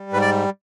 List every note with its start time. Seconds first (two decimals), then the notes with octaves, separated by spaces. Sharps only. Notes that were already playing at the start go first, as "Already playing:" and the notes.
Already playing: G3
0.13 G#2 B4
0.22 D5